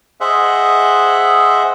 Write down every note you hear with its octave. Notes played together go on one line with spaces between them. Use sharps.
G#4 C5 D#5 E5 F#5